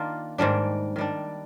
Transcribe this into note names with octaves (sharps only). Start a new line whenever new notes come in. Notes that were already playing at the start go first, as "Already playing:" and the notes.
Already playing: D#3 A#3 D4 F4
G#2 D#3 G3 D4
D#3 G3 D4